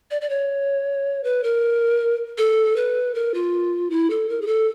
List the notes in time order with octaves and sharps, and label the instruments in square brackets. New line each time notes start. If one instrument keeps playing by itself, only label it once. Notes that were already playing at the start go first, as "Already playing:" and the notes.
[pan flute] D5
D5
C#5
B4
A#4
A4
B4
A#4
F4
E4
A4
A#4
G#4
A4